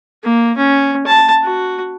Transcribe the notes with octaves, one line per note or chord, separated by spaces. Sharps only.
A#3
C#4
A5
F#4